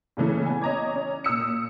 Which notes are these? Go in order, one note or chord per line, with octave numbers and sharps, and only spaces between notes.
A#2 C#3 E3 A3
B3 G#5
C#5 D#5 A#5 D6 G#6
C#4
A#2 D#6 E6 C#7